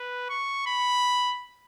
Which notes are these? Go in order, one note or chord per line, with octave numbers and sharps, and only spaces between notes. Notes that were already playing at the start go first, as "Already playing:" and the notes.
Already playing: B4
C#6
B5